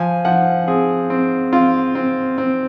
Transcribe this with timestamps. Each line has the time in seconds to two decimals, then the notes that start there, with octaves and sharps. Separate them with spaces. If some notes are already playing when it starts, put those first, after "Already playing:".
Already playing: F3 G#5
0.25 F3 F#5
0.67 C4 G#4
1.10 C4
1.52 C4 F4
1.95 C4
2.38 C4